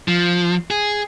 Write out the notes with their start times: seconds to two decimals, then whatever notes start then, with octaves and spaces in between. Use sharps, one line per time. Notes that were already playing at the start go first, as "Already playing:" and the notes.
0.08 F3
0.71 G#4